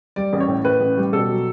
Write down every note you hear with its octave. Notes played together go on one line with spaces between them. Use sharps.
G3 D5
A1
C#5
A2
A2 B4
A1
G3
B2 A4
F#3